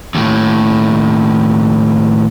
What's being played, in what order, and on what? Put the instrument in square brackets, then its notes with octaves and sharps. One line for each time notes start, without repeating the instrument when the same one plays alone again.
[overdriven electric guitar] D#2 A2